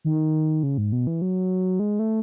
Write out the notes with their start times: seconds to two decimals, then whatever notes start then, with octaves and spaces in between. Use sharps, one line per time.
0.05 D#3
0.63 C#3
0.78 G#2
0.92 B2
1.07 E3
1.22 F#3
1.79 G#3
1.99 A3